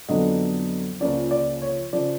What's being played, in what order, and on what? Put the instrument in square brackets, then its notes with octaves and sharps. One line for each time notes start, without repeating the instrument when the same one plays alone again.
[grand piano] F2 D3 F#3 B3 D4 D#5
C#2 C#3 F3 A#3 D5
D5
C#5
C#3 F3 D5